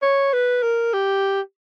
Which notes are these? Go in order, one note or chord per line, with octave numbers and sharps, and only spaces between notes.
C#5
B4
A#4
G4